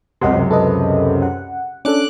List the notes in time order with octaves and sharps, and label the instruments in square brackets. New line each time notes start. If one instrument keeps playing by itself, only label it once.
[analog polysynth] C#2 F#2 C3 [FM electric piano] D#5 F#5 C6
[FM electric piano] A4 B4 D#5
F#5
[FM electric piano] C#4 D4 A4 [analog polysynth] D6 F#6